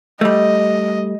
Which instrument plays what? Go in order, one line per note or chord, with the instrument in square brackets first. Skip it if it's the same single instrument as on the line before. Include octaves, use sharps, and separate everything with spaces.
[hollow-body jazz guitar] G3 A3 [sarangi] D#5